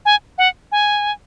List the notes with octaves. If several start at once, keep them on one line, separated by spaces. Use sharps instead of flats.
G#5
F#5
G#5